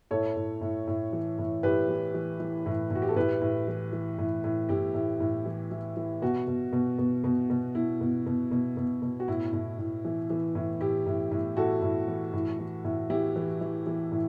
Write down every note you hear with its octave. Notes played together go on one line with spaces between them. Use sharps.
A2 A4 C#5
A2
A2
A2
E3
A2
A2 G4 B4
E3
E3
E3
A2
A2 F#4
G4
A4
A2 G4 B4
A2
E3
E3
A2
A2
A2 E4 G4
A2
A2
E3
E3
E3
B2 F#4
B2
B2
B2
B2
B2
B2 E4
B2
B2
B2
B2
B2
F#4
A2 E4
A2
A2
E3
E3
A2
A2 E4 G4
A2
A2
A2 F#4 A4
A2
E3
A2
E3
A2
E3 E4 G4
E3
E3
E3
A2